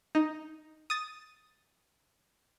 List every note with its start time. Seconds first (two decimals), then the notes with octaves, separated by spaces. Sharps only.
0.15 D#4
0.90 D#6 A6